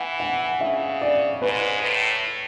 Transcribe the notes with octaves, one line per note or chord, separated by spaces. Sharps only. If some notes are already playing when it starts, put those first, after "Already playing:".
Already playing: E3 F#5
F#5
C#3 E5
D5
G#2 B4
A2